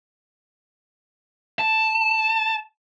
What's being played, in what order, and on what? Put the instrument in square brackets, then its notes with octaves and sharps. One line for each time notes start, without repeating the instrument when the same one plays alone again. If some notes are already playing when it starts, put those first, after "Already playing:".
[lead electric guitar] A5